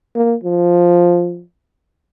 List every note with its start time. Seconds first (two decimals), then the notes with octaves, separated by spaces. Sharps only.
0.15 A#3
0.44 F3